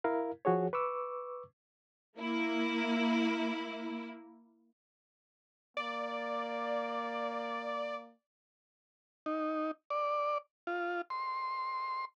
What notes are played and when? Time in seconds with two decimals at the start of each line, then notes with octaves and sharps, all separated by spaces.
0.04 E4 A#4 F5
0.45 F3 F#4 G#4 C#5
0.73 B4 C#6 D6 E6
2.18 A#3 E4
5.77 A#3 D5
9.26 D#4
9.90 D5
10.67 F4
11.10 C6